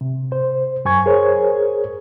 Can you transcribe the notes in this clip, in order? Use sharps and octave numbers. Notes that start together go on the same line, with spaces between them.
C3
C5
F#2 G#5 C#6 G#6
G#4 A#4 C5 C#5